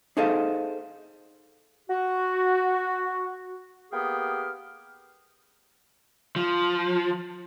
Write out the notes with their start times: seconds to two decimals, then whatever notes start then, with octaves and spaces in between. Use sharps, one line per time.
0.17 D#4 G#4 A4 C5 D#5 F5
1.90 F#4
3.92 A#3 B3 G4 G#4 G5 F6
6.36 F3